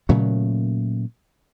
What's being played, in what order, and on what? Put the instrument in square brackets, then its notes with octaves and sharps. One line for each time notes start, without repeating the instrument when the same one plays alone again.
[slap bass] A#2 C#3 F#3 A3